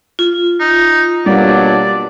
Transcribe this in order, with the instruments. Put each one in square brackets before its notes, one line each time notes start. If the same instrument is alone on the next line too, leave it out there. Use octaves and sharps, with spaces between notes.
[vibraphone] F4
[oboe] D#4
[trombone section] B2 F#3 D4 [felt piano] G3 A#3 [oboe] D5